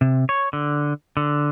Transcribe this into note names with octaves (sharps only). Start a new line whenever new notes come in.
C3
C#5
D3
D3